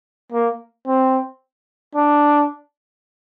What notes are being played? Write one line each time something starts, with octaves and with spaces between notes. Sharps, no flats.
A#3
C4
D4